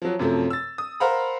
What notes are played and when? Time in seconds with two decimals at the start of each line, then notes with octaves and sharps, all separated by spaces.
0.02 F3 F#3
0.19 F#2 C3 F3 A3
0.50 E6 A6
0.78 D#6
1.00 A#4 C5 F5 F#5 A#5 B5